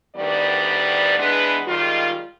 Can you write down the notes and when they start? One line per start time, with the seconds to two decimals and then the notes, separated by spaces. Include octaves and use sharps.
0.16 D2 D#3 G3 B3 D5
1.19 E3 G#3 B3 D4 B4
1.68 D#3 G3 G#3 F4